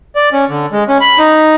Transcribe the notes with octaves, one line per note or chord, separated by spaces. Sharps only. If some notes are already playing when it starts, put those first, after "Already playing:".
D5
C#4
D3
G#3
C#4
B5
D#4